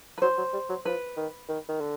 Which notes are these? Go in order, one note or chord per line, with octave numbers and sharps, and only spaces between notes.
B4
F#3 C5
F#3
G3
F#3
F3 B4
D#3
D#3
D#3
D3